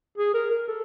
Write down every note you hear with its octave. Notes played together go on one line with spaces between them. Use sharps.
G#4
A#4
A#4
A4